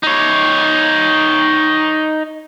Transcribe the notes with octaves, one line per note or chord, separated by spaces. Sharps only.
D#4 C#5